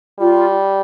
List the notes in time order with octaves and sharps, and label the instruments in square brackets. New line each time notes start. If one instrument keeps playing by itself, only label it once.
[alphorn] G3 [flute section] F4